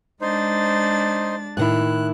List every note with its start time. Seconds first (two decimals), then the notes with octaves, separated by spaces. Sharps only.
0.21 G#3 D4 D#4 C5 A6
1.57 A2 D#3 E4 F#6